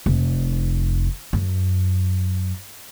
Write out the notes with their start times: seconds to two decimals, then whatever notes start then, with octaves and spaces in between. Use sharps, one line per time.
0.06 F1
1.33 F#2